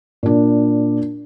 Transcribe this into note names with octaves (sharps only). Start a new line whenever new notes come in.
A#2 D4